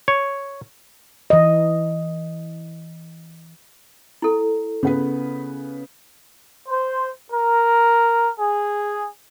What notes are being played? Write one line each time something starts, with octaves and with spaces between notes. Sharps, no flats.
C#5
E3 D#5
E4 A4
C#3 B3 B4
C5
A#4
G#4